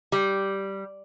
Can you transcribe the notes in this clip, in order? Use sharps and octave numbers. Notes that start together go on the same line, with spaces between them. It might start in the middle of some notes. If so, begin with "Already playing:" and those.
G3